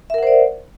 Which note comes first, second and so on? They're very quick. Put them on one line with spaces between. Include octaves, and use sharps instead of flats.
E5 A#4 F#5 C5 D5